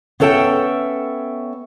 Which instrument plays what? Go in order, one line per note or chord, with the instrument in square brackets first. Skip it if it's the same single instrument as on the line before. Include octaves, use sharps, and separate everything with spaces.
[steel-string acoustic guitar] B3 C#4 A4 E5 G5